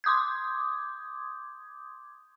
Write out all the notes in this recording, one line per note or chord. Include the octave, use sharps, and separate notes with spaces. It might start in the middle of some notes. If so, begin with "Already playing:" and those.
C6 D6 D#6 G6 G#6